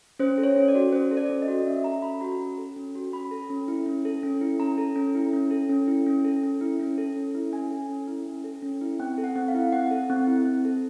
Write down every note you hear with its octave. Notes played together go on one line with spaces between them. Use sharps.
C#4 C5
A4
C#5
C#4
D5
F#4
C#4 C5
A4
D5
C#4
D#5
F#4
C#4 E5
A4 A#5
C#4 B5
F#4 A#5
C#4
A4
C#4
F#4
C#4 B5
A4
C#4
E4
C#4
A4
C#4
E4
C#4 A#5
A4
C#4
E4
C#4
A4
C#4
E4
C#4
A4
C#4
E4
C#4
A4
C#4
E4
C#4 G#5
A4
C#4
E4
C#4
A4
C#4
E4
C4 G5
A4
F#5
C4
F5
E4
C4 F#5
A4
C4
E4
C4
A4